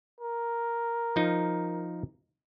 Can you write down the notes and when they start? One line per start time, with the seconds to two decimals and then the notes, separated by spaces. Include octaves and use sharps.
0.20 A#4
1.16 F3 D#4